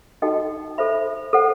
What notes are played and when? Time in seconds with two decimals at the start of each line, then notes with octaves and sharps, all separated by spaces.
0.22 D#4 F#4 A4 D#5 G5
0.78 A4 C5 E5 B5
1.33 A4 C5 F#5